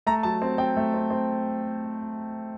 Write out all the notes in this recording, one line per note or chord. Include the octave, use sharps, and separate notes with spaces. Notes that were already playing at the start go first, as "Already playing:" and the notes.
A3 A#5
F#3 A5
C4
C4 G5
A3
C4
C4